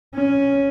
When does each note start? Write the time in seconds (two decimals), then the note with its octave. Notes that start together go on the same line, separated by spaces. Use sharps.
0.15 C#4